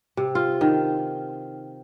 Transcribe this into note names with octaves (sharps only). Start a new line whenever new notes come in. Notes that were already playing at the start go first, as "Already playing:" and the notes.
C3
F4
D#3